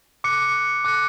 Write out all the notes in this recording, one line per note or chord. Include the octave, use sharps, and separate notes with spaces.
D6 F#6 C#7
D6 F#6 C#7